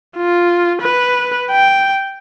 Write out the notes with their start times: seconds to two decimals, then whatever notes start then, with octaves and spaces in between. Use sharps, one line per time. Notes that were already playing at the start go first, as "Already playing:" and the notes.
0.17 F4
0.81 B4
1.51 G5